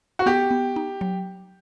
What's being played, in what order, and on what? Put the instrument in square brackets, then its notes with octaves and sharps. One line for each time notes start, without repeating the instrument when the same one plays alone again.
[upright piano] F#4
[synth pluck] B3 [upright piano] G4
[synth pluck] B3
D#4
F#3